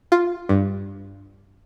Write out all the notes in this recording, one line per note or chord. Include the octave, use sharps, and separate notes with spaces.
F4
G2